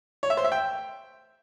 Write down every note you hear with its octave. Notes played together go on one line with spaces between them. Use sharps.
C#5
E5
C5
E5
G5